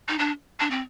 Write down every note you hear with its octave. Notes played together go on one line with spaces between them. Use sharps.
D#4
D4
D4
C4